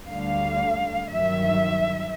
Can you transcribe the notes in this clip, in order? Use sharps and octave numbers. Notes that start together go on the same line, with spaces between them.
D2 D3 G3 F5
G2 D#3 F#3 E5